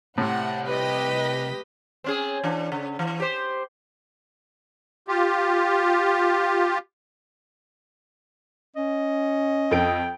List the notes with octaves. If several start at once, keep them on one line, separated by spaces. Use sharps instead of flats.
C2 A2 C3 F#5
G4 B4 D#5 B6
C4 C#4 G#4
E3 D4
C#3
E3
G4 C5
F4 G4
C#4 D#5
F2 A4 G5 D7